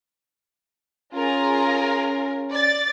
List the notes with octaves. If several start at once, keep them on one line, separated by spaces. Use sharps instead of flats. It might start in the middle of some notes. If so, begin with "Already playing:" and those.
C#4 F4 G#4 A#4
D5 A6